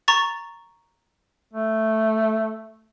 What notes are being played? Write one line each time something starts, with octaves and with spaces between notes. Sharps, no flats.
A#5 C#6 A6
A3